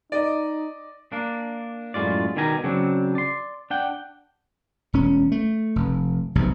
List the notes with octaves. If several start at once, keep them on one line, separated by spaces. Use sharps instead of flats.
D#4 D5 D#5
A#3 D4
F#2 A2 G#3 F4 D5
B2 D#3 G3 G#5 A#5
C#3 F#3 C4 D4
D5 C6
D4 F#5 G5
E1 C#4
A3
F1
F1 B1 C3